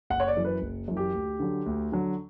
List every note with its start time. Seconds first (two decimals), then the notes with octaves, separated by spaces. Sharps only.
0.10 F#1 F#5
0.20 C#5
0.28 D5
0.36 F#2 E3
0.45 B4
0.62 F#1
0.88 F#2 E3
0.97 G4
1.14 D2
1.40 D3 F#3
1.66 D2
1.92 D3 F#3